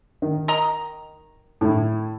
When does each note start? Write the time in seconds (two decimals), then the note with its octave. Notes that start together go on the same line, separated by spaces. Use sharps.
0.22 D#3
0.48 A#4 D#5 A#5
1.61 A2 E4